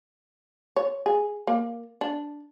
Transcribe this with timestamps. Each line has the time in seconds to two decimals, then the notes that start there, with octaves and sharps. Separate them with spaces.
0.76 C#5
1.06 G#4
1.47 A#3
2.01 D4